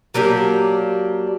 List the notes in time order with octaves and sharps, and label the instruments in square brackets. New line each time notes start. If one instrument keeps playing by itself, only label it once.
[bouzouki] F#3 A#3 D4 G4